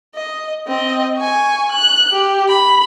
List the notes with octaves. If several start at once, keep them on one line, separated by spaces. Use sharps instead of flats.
D#5
C4 D#5
G#5 C#6
F#6
G4
B5